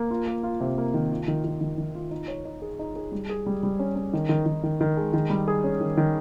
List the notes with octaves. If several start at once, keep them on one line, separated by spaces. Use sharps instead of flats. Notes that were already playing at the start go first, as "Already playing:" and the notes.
Already playing: A#3
F4
A#3
F4
C3
A#3
D#3
F4
D#3
D#3
D#3
D#3
F4
D#4
C#5
D#4
G#4
D#4
G#4
G3
G#4
G3
G3
C#4
C#4
D#3
D#3
D#3
D#3
D#3
G#3
D#3
G3
G#4
C#4
D#3
D#3